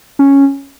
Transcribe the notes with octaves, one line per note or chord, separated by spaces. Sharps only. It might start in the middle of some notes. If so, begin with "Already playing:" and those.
C#4